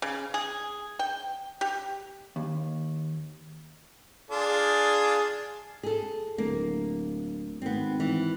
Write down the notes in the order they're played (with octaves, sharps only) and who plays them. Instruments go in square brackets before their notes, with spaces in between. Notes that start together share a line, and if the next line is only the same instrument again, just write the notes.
[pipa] C#3
G#4
G5
G4
[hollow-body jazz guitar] D#2
[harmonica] D4 F4 [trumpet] G#4
[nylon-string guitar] G#4 A4
[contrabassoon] D1 [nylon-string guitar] A#3
[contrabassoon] G#1 [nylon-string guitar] B3 C4
[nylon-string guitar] E3